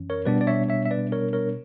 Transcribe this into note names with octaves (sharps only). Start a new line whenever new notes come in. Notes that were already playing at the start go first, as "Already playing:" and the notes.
Already playing: F#2 E3 C#4
A#4 C#5
B2 G3 B3 D4 B4 D5
D5
C#5 E5
C#5 E5
E5
B4 D5
A#4 C#5
A#4 C#5